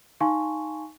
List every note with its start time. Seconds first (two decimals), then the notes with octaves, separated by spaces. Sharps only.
0.20 D#4 F5 G#5 A5 C6 C#6